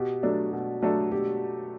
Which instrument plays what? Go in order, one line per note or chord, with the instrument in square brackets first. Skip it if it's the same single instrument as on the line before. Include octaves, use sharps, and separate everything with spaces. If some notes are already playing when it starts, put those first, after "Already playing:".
Already playing: [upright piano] B2 [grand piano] G4
[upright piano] F#3 A3 D4 A4
B2
F#3 A3 D4 A4
[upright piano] B2 [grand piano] G4